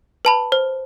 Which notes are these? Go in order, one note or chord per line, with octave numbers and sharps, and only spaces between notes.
B4 A5 B5
C5